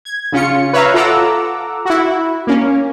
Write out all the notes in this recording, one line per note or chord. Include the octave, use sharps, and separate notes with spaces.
G#6
C#3 C#4 F4 C#7
B4 C#5 E5 F5 A#5
F4 A4 F#5 A#5 D6 E6
E4 F#4
A#3 C#4